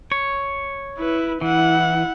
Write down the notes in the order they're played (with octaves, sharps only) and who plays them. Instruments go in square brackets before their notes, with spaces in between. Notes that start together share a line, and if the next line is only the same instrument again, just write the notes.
[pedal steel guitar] C#5
[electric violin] E4 B4
[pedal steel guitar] E3 [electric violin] E4 F#5